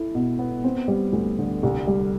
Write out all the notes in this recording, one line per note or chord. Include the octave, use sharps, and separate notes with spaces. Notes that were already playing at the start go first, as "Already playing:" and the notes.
Already playing: E4 A4
B2
B3
C4
G3
D2
D3
C2
G3